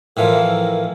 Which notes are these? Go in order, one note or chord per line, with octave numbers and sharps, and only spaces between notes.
A2 E3 F3 A#4